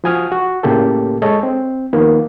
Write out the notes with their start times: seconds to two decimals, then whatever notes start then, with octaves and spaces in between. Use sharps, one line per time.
0.04 F3 F#4 G#5 D#6 F6
0.32 F#4
0.63 A2 C#3 A#3 G4 A4
1.22 G#3 A4 C#5 D#5
1.43 C4
1.93 D#3 F3 A#3 B3